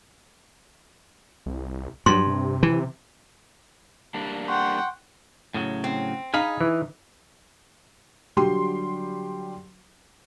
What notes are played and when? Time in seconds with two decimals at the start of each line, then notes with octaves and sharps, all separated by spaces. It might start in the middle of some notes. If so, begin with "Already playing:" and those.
1.46 C2
2.06 G2 F#3 C6
2.27 C3
2.63 E3
4.14 G3 A#3 D4
4.48 F#5 G5 C6 C#6
5.54 A2 C#3 F#3
5.84 C4
6.34 D#4 G#4 F5 B5
6.61 E3
8.37 D3 F#3 G3 G4 G5 C6